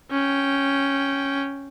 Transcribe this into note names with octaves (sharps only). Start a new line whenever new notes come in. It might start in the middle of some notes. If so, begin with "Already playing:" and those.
C#4 G5